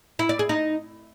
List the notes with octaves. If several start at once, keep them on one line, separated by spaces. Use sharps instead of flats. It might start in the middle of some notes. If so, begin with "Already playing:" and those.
E4
D5
G#4
D#4